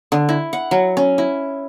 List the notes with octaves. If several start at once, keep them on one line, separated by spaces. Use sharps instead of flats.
D3
E4
F#5
F#3
C#4
E4